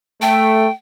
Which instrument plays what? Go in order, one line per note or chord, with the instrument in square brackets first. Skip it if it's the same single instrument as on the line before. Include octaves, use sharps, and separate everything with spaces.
[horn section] A3 [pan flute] G5